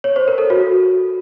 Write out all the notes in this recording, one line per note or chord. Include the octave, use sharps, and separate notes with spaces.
C#5
C5
A#4
A4
F#4